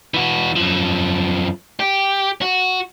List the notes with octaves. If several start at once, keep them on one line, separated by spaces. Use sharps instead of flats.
E3 F#4
F#2 F3
G4
F#4